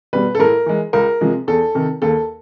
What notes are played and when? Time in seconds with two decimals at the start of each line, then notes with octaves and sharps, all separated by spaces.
0.13 B2 G3 B4
0.35 A4
0.39 A2 A#4
0.66 E3 G#3
0.93 C#2 A#4
1.21 C3 F3 G#3
1.47 E2 A4
1.75 C3 D#3
2.02 D#2 A4